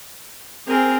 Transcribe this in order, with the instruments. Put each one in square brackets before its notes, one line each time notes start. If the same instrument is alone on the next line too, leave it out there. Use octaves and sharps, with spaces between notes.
[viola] C4 A#4 [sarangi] G#4